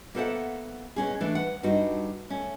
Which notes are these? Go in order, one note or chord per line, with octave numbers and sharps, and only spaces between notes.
A#3 B3 A4 C5 E5 F#5
B2 C#4 G#4
E3 A3 D4
B4 F#5
G2 G3 D#4 F#4
A3 C#4